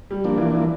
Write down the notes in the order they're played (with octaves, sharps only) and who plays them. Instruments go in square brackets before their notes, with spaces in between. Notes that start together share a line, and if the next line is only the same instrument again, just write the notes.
[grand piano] G3
[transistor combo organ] F3 A#3 D4
[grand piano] E3
E3